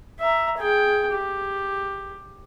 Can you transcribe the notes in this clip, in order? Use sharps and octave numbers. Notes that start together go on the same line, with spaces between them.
E5 A#5
G#4 G5
G4